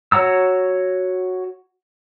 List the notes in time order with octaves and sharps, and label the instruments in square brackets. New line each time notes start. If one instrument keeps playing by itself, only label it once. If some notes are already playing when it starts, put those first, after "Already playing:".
[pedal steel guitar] F#4 C#5 F#5 A#5 E6